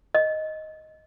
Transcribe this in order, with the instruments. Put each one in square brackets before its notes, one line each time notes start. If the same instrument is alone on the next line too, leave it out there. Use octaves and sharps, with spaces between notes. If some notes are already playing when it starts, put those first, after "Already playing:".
[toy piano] D#5